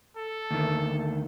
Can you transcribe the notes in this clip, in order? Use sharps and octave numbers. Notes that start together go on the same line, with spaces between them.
A4
D2 D#3